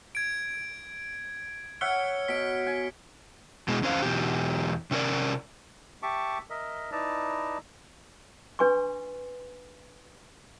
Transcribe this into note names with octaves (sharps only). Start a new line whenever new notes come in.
G#6 D7
C#5 E5 F#5 F6 C#7 G7
B2 B6 D7
G#5
B2 G#3
E2 C#4 C5 F5
E2 B2 G4
C3 C#4 G4 A#4 D5
G4 E5 A5 C#6 D6
A#4 D#5 E5
D#4 E4 B4 D5 A5 A#5
D4 B4 G#5 C6 C#6